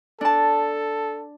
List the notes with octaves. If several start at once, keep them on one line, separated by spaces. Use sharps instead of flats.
D4 A4 A5